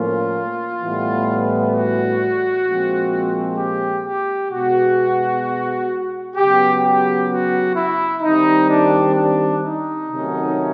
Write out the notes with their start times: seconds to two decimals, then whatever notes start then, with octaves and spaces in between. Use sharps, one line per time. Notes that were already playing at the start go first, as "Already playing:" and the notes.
Already playing: A2 F3 A#3 C#4 F4
0.79 A2 E3 G3 B3
1.72 F#4
2.66 A#2 F3 G#3 C4
3.58 G4
4.05 G4
4.50 B2 G#3 B3 F#4
6.37 C#3 F#3 B3 G4
6.84 G4
7.30 F#4
7.76 E4
8.22 D#3 G3 C4 D#4
8.69 D4
9.16 D4
9.63 D#4
10.09 C3 D#3 F#3 A3 C#4